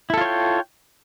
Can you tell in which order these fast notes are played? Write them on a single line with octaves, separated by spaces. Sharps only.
E4 A4 F4 C#5 G5